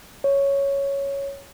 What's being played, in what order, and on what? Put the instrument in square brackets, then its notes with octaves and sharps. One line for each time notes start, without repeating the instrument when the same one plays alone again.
[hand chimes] C#5